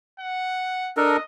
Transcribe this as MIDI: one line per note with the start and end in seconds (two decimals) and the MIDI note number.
0.20 0.91 78
0.97 1.17 62
0.97 1.17 69
0.97 1.17 70
0.97 1.23 75